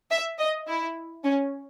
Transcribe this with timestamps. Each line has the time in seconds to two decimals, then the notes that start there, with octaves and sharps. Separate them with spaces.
0.11 E5
0.39 D#5
0.67 E4
1.24 C#4